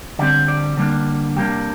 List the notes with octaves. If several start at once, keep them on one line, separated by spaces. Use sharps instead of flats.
D3 G3 C4 D5
D5
D3 G3 A#3 D4
C3 G3 A#3 D4 G4